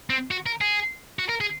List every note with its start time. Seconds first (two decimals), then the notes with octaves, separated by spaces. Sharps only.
0.10 C4
0.31 F#4
0.46 A#4
0.61 G#4
1.19 F#4
1.29 A#4
1.41 G#4